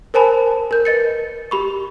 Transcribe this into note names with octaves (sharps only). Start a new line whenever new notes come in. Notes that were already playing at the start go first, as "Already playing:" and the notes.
A#4 C5 G#5 A5 B5
A#4 G6
B4 D#5 A6 C#7
G4 B5 C#6